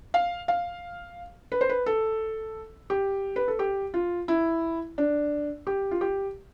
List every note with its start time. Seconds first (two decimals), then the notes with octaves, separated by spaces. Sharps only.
0.14 F5
0.48 F5
1.52 B4
1.61 C5
1.69 B4
1.86 A4
2.90 G4
3.36 B4
3.48 A4
3.59 G4
3.94 F4
4.28 E4
4.98 D4
5.67 G4
5.91 F4
6.01 G4